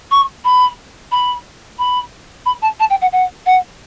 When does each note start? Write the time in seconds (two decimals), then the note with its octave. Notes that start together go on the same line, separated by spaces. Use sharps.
0.11 C#6
0.45 B5
1.12 B5
1.79 B5
2.46 B5
2.62 A5
2.80 A5
2.90 G5
3.01 F#5
3.12 F#5
3.46 F#5